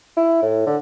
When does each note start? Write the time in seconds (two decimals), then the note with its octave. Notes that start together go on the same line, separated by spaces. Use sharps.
0.16 E4
0.42 A2
0.66 D3